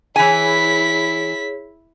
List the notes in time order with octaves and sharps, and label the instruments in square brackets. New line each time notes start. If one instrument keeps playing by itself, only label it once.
[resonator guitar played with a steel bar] E3 G#5 [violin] E4 B6 [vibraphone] G#4 C#5